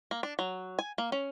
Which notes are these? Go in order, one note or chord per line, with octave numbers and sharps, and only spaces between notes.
A#3
D4
F#3
G#5
A#3
C#4